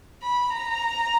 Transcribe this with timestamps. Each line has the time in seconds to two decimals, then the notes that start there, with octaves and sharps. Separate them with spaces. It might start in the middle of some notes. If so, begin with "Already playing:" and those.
0.22 B5
0.50 A#5